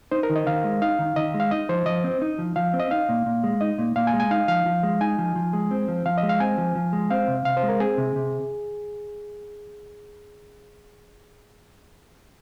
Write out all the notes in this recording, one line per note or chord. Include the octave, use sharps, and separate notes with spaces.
D#4 C5
A#4
D#3
D#5
D#3 F5
G#3
D#4 F5
D#3
D#3 D#5
G#3
F5
D#4 D#5
F3 C5
F3 D#5
C4
D#4
F3
F3 F5
C4
D#5
D#4 F5
A#2
A#2
G#3
D#4 D#5
A#2
A#2 F5
G#5
G#3
G#5
D#4 F5
F3 F5
F3
G#3
D#4 G#5
F3
F3
G#3
C4
F3
F3 F5
D#5
G#3
F5
C4 G#5
F3
F3
G#3
C4 F5
C3
C3 F5
C5
G#3
A#4
C4 G#4
C3
C3